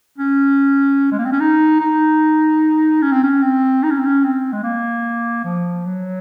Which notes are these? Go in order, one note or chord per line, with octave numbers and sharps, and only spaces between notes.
C#4
G#3
A#3
C4
C#4
D#4
D#4
C#4
C4
C#4
C4
D#4
C#4
C4
C#4
C4
G#3
A#3
F3
F#3